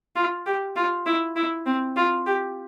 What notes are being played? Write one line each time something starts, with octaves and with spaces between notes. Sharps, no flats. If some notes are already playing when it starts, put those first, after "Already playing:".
F4
G4
F4
E4
E4
C4
F4
G4